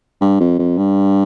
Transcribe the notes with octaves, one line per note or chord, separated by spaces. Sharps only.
G2
F2
F2
G2